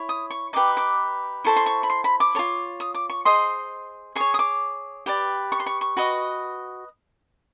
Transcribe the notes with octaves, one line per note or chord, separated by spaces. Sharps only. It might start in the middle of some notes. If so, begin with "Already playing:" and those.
Already playing: E4 C#5
D#6
C#6
D#4 G4 B4 D6
D6
E4 A4 C5 C#6
C6
C#6
B5
C6
B5
D6
F4 A4 C#5
D#6
D6
C#6
G#4 C5 D#5 C6
G#4 C#5 C#6
D#6
D6
G4 B4 D5
C#6
C6
C#6
C#6
F#4 B4 D#5